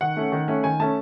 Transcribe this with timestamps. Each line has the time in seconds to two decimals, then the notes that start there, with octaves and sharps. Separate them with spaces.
0.01 D#3 F#5
0.17 A3 C#4
0.32 D#3
0.48 A3 C#4
0.64 D#3 G#5
0.80 A3 C#4 A5